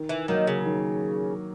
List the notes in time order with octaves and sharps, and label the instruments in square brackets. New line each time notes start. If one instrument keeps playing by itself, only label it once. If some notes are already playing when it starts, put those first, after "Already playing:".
Already playing: [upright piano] D#3
[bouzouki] E3
[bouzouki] D#3 [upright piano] F#3 A#3
[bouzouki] C#3
[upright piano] D#3